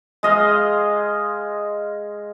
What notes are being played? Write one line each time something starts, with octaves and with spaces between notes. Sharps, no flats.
G#3 D#5 F5